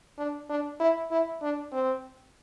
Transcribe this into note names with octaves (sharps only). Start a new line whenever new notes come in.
D4
D4
E4
E4
D4
C4